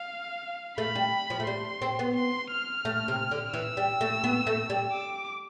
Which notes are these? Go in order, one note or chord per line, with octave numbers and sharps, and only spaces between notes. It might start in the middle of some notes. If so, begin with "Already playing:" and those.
Already playing: F5
A3 B5
G3
F3
A3
G3 C6
C4
B3
C6
F6
A3
C3
D3
E3 E6
G3
A3
B3
A3
G3
D6